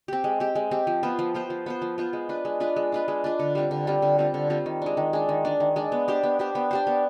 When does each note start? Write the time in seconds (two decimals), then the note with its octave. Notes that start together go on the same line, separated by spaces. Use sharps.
0.08 C4 G4
0.24 G#3
0.40 C4 G4
0.55 G#3
0.71 C4 G4
0.87 F3
1.03 B3 F4 C5
1.19 F3
1.34 B3 F4 C5
1.50 F3
1.66 B3 F4 C5
1.82 F3
1.98 B3 F4 C5
2.13 G#3
2.29 D4 F4 B4
2.45 G#3
2.60 D4 F4 B4
2.76 G#3
2.92 D4 F4 B4
3.08 G#3
3.24 D4 F4 B4
3.39 D3
3.55 G3 C4 F4
3.71 D3
3.87 G3 C4 F4
4.02 D3
4.19 G3 C4 F4
4.34 D3
4.50 G3 C4 F4
4.66 D#3
4.82 G#3 D4
4.97 D#3
5.13 G#3 D4
5.29 D#3
5.45 G#3 D4
5.60 D#3
5.76 G#3 D4
5.92 B3
6.08 D4 G4 C5
6.23 B3
6.39 D4 G4 C5
6.55 B3
6.71 D4 G4 C5
6.87 B3